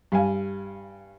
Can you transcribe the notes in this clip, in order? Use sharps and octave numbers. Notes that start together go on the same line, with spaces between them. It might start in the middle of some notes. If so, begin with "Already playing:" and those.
G2 F5 G#5